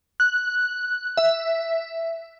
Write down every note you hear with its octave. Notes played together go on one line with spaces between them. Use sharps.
F#6
E5